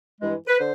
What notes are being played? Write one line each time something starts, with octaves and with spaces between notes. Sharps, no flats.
G2 E3 G#3
B4
D3 C5